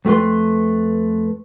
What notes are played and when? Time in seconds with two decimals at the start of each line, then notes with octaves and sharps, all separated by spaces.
0.05 F2 A3 G4 B4 C6